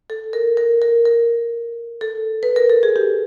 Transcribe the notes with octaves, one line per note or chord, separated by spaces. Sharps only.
A4
A#4
A#4
A#4
A#4
A4
B4
A#4
A4
G#4
G4